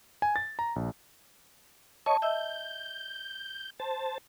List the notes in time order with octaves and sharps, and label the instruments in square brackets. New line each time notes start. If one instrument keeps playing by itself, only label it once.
[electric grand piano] G#5
A6
A#5
A#1
[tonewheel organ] C#5 D#5 C#6 [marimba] A5
[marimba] D#5 E5 E6 [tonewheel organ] G6
[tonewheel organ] C5 A5